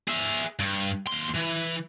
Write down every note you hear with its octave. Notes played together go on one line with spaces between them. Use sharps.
G#4 E5
G2
D#2 C6
E3